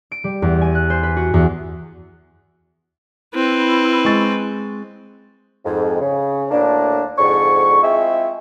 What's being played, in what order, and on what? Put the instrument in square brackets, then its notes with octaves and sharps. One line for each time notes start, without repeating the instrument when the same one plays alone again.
[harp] D7
G3
E2
G#5
F#6
C5
B4
F#4
E2
[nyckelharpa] C4 B4 [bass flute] E4
[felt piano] G#3 C#6 A6
[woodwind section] F2 G#2
C#3
D2 A2 A#3 D4
F2 G#2 D3 C#6
G#3 C4 E4 F4 G#4 E5